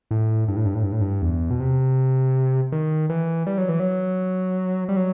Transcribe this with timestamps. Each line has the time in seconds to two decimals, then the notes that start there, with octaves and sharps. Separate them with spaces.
0.11 A2
0.48 G2
0.57 A2
0.66 G2
0.75 A2
0.83 G2
0.92 A2
1.01 G2
1.22 E2
1.50 B2
1.60 C3
2.72 D#3
3.09 E3
3.47 G3
3.58 F#3
3.69 E3
3.80 F#3
4.89 G3
4.96 F#3